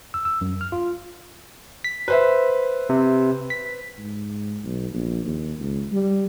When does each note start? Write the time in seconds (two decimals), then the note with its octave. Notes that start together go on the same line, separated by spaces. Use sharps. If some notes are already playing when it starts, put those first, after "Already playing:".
0.14 E6
0.25 E6
0.41 F#2
0.61 F6
0.72 F4
1.84 B6
2.08 B4 C5 E5
2.89 C3
3.50 B6
3.98 G#2
4.64 B1
4.93 A#1
5.25 D#2
5.59 C#2
5.92 G3